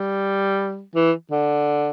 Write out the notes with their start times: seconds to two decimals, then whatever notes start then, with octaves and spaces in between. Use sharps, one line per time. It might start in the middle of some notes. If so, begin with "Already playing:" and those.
Already playing: G3
0.95 E3
1.31 D3